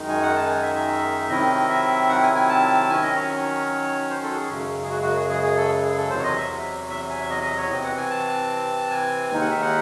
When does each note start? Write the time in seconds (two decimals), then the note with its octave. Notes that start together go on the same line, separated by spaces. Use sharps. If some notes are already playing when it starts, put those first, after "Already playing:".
Already playing: F#2 D#3 G#3 D#4
0.09 G#5
0.23 F#5
0.36 A5
0.49 G#5
0.63 E5
0.76 E5
1.29 C3 D#3 F#3 C4 E4 D#5
1.69 E5
2.09 F#5
2.23 G#5
2.36 G#5
2.49 A5
2.89 D#3 F#3 C#4 G#5
3.03 D#5
3.16 C#5
4.10 C5
4.23 A4
4.32 F#4
4.36 G#4
4.50 F#2 C#3 G#3
4.83 G#4
4.90 F#4
5.03 F#4
5.16 G#4
5.30 G#4
5.44 G#4
5.57 A4
5.83 G#4
5.97 A4
6.10 E2 C3 F#3 C5
6.18 C#5
6.23 D#5
6.37 E5
6.90 E5
7.10 G#5
7.20 E5
7.30 D#5
7.43 D#5
7.57 C#5
7.70 C3 E3 C4 D#5
7.84 F#5
7.97 G#5
8.10 A5
8.91 G#5
9.31 D#2 D#3 G#3 D#4 G#5
9.41 F#5
9.51 E5
9.62 F#5